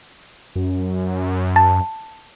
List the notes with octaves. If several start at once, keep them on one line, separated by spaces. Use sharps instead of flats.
F#2
A5